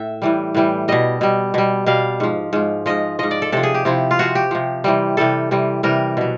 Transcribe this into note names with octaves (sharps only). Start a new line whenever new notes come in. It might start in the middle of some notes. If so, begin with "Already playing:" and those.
Already playing: A2 E5
A2 E3 G3
A2 E3 G3
B2 G3 D#5
B2 G3
B2 G3
B2 G3 F5
G#2 F3
G#2 F3
G#2 F3 D#5
G#2 F3 D#5
D5
A4
C3 F3 A4
G#4
G4
C3 F3 E4
F4
C3 F3 F#4
G4
C3 F3
C3 E3 G3
C3 E3 G3 A4
C3 E3 G3
C3 E3 G3 A#4
B2 F#3